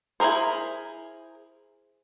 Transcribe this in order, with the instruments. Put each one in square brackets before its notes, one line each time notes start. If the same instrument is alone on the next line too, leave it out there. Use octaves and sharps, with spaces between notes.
[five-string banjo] E4 F4 G#4 A#4 C5